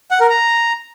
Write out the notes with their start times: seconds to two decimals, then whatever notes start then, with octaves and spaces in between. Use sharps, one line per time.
0.11 F#5
0.20 A#4
0.30 A#5